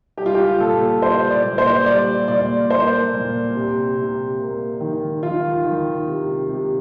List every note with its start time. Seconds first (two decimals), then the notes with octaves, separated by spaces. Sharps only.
0.18 G3 G4
0.26 F4
0.34 G4
0.60 A#2 A4
1.02 G3 C5
1.30 D5
1.44 A#2
1.58 C5
1.86 G3 D5
2.28 A#2 D5
2.70 A#3 C5
3.13 A#2
3.55 C3
3.96 C3
4.39 A#3
4.81 D#3
5.23 D#3 F4
5.65 D#3
6.08 C3
6.49 C3